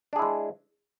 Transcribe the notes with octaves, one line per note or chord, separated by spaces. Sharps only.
G#3 D4 E4 G#4